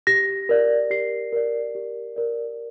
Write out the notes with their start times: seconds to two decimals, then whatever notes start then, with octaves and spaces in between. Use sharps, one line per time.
0.07 G4 A#6
0.49 A#4 D5
0.90 G4 C7
1.33 A#4 D5
1.75 G4
2.16 A#4 D5